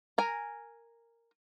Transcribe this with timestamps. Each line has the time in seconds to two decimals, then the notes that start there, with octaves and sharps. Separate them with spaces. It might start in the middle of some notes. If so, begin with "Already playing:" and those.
0.18 A#4 G#5 A#5